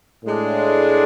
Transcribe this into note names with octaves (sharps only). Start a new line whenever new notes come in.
A2 G#3 D4